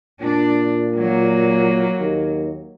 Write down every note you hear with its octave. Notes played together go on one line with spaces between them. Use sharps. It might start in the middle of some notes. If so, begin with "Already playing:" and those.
A#2 D4
F#3 A#3
D#2